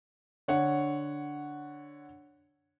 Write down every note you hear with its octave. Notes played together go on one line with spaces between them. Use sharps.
D3 C#5 F#5